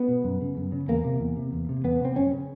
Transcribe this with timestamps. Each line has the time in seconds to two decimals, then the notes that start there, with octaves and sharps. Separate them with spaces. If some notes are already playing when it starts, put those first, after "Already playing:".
Already playing: B3
0.08 B2
0.24 F#2
0.41 C#3
0.57 F#2
0.72 C#3
0.88 E2 A#3
1.04 C3
1.20 E2
1.37 C3
1.53 E2
1.69 C3
1.84 E2 B3
2.00 C3 C4
2.16 F#2 C#4
2.33 C#3